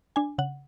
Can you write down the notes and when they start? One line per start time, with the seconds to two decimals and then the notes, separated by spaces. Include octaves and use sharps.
0.16 D4 G#5
0.38 C#3 F#5